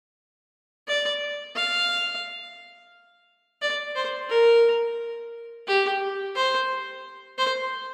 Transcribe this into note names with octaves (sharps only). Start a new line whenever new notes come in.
D5
F5
D5
C5
A#4
G4
C5
C5